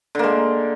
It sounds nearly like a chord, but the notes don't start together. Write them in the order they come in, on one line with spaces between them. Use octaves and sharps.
D3 A#3 G#3